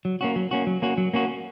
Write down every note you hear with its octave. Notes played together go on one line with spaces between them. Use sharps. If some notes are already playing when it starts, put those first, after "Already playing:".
F#3
A#3 C#4 F#4
F#3
A#3 C#4 F#4
F#3
A#3 C#4 F#4
F#3
A#3 C#4 F#4